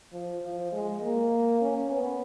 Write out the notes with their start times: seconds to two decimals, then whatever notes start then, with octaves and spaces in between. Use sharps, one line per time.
0.13 F3
0.42 F3
0.72 G#3
1.01 A#3
1.61 C#4
1.91 B3